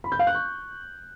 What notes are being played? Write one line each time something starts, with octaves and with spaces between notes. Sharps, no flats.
B5
G6
F5
F#6
C#6